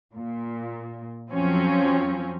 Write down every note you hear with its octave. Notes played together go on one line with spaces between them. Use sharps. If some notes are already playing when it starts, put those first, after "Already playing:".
A#2
F2 F3 F#3 C4 C#4